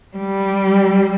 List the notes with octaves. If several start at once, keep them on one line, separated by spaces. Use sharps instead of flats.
G3